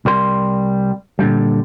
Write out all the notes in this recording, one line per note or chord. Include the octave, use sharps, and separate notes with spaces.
C2 G3 A#4 C6
A#2 D3 G3